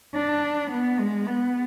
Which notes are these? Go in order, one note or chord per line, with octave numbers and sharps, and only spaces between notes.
D4
B3
G#3
B3